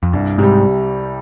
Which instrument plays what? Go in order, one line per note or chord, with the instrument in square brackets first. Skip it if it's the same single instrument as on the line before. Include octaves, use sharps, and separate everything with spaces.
[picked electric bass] F2
[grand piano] C2 [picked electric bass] G2
[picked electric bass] G#2 [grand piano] C3 G3